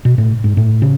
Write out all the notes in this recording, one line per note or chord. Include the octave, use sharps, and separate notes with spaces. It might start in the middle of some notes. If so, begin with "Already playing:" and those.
B2
A2
G#2
A2
C#3